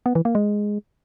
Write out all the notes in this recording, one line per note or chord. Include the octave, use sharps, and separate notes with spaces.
B3
E3
A#3
G#3